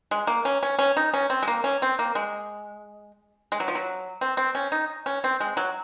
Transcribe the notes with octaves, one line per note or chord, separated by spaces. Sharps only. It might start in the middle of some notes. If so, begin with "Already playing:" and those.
G#3
A#3
C#4
C#4
C#4
D#4
C#4
C4
G#3
A#3
C#4
C4
A#3
G#3
G#3
F#3
F3
F#3
C4
C4
C#4
D#4
C#4
C4
G#3
F#3